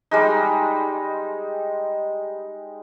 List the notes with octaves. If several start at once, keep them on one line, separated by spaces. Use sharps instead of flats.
G3 G#3 D#4